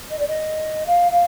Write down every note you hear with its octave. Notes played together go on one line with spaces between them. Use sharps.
D#5
D5
D#5
F5
F5